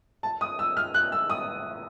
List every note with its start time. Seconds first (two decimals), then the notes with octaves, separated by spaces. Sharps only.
0.23 A5
0.41 D#6
0.59 E6
0.77 F6
0.94 F#6
1.12 E6
1.30 D#6